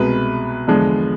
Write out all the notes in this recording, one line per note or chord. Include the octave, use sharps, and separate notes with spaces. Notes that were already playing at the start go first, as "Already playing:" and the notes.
Already playing: C2 B2 G#3 B4
E2 D3 F3 G#3